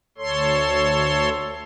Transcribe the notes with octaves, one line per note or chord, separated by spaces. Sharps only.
D2 A4 C#5 C6